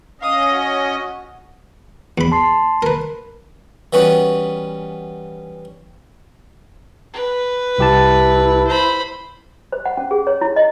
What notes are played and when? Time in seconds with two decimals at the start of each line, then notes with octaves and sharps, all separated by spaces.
0.21 C#4 D#5 F5 D#6
0.52 F#4
2.18 E2 B5
2.32 A5 C6 C7
2.82 A#4 B4
3.93 E3 G3 B3 C#4 F#4
7.13 B4
7.78 C2 E4 G4 A5
8.67 C5 B5
9.72 C5
9.86 F#5
9.97 C#4
10.11 G#4
10.27 C#5
10.41 E4
10.56 D#5